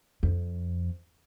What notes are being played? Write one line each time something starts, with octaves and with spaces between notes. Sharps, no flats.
F2